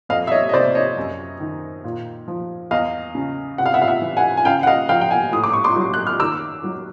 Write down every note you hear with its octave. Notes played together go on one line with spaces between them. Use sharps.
F2 D#5 F5
E5
C#5 D#5
D#5
C3 C5 D5
C#5 D#5
F#2
D#3
A#2
F3
E2 D#5 F5
C#3
C3 F#5
F5
E5 F#5
F5
E5 F#5
E3
F#5 G#5
G#5
C#3 F5 G5
F#5
D#5 F5
F3 F5 G5
G5
F#5 G#5
A2 D#6
D6
C#6
C6 D6
F#3
F#6
F6
D#3 D6 E6
F#3